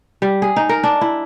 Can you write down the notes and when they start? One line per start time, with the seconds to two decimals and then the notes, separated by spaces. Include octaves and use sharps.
0.22 G3
0.42 G#4
0.56 D#4
0.69 A#4
0.83 D4
1.01 E4